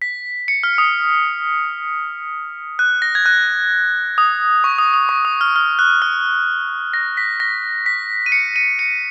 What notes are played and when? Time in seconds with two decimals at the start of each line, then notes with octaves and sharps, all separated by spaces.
0.02 B6
0.48 C#7
0.63 F6
0.78 D#6
2.79 F#6
3.02 A#6
3.15 G#6
3.26 F#6
4.18 D#6
4.64 C#6
4.78 D#6
4.94 D#6
5.09 C#6
5.25 D#6
5.41 F6
5.56 F6
5.79 F#6
6.02 F6
6.94 A#6
7.17 B6
7.40 A#6
7.86 B6
8.26 D#7
8.32 C#7
8.56 D#7
8.79 C#7